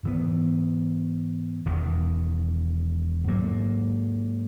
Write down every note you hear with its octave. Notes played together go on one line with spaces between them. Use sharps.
G#2 E3 B3
E1 E2 D#3
G#2 F#3 A#3